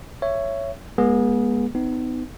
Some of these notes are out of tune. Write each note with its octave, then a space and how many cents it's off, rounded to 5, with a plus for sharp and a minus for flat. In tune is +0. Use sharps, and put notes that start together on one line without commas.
C#5 +0 E5 +20
G#3 +0 B3 -40 G#4 +0
B3 +40 D#4 +0